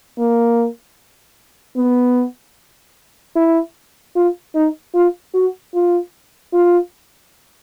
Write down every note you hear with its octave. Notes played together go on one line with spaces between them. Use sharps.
A#3
B3
E4
F4
D#4
F4
F#4
F4
F4